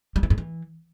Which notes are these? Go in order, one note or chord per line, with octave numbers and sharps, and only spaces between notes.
G3
E3
G2
E3